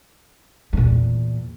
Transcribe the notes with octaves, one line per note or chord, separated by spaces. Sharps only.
E2 A#2